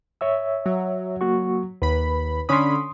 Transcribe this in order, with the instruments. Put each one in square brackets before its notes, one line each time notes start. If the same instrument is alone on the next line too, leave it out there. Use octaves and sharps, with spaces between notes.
[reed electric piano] C#5 E5 E6
[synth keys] F#3
[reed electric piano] A#3 F#4 C#6
[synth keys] D#2 B5 [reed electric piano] B4
[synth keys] D3 C#4 B5 [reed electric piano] C6 D#6